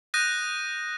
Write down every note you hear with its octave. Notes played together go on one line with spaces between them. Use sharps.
D#6 F#6 G6 A#6 D#7